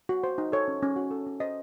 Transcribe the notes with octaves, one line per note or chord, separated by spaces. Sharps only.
F#4
C5
D#4
A4 C#5
C#4
C#4
F#4
A4
C#4
C5 D#5